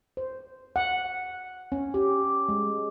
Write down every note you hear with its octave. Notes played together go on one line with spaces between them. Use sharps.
C5
F#5
C#4
G4
G#3